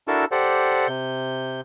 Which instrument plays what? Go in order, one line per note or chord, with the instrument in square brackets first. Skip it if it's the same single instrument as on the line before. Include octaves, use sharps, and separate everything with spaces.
[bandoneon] D4 E4 F#4 A4 A#4 A5
G4 A4 C5 D5 F#5
C3 G6